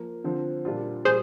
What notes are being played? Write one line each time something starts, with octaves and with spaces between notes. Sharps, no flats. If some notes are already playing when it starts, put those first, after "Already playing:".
Already playing: F3 A#3
D3 F3 C4
A#2 G3 D4 F4
A#2 G3 G#4 C5